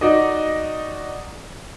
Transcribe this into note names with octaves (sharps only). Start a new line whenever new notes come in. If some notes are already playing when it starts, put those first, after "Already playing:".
D#4 F#4 D5 D#5